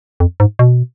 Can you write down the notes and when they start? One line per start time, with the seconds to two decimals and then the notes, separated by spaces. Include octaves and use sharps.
0.20 F2
0.40 G#2
0.59 B2